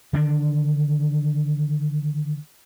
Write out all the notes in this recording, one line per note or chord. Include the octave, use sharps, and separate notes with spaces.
D3 D#3 D4